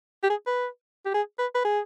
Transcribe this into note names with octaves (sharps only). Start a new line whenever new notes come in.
G4
G#4
B4
G4
G#4
B4
B4
G#4